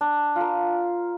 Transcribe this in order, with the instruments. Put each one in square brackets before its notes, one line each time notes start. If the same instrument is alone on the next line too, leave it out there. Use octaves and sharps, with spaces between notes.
[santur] D4
F4 A#4